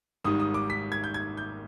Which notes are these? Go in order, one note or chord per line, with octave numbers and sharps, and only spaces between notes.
G#1 G#2 D#3 G3 D#6
D#6
D6
B6
G#6
G6
G#6
G6